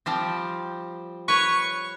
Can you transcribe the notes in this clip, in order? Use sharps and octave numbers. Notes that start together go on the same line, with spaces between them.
F3 G3 C4
B4 C#5 C#6